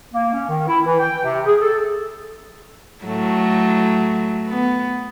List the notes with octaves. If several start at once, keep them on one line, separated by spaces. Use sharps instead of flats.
A#3
C#4
D#3
E4
E3
G5
C3
G#4
A4
A2 F#3 A3
B3